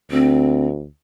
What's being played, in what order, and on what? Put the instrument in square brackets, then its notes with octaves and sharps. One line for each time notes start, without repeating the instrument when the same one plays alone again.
[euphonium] D2 [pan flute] C4